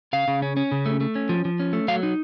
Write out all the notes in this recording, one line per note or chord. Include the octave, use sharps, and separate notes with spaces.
C#3 F5
C#3
C#4
C#4
C#3
A3
A3
C#4
F3
F3
C#4
A3
F#3 F5
D#4